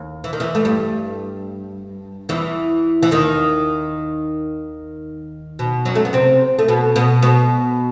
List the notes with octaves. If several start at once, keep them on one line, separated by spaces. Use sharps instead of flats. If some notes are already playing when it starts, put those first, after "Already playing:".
Already playing: D#2
E3
D#3
E2 E3
A3
G2 G3
E2 E3
E3
D#2 D#3
B2
F#2 F#3
A3
B3
C3 C4
A3
B2 B3
B2 B3
B2 B3